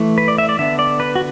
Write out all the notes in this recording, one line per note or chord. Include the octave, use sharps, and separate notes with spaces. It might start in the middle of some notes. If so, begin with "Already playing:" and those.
Already playing: E3 A3
B4
D5
E5
D5
D3 B3 E5
D5
B4
F#4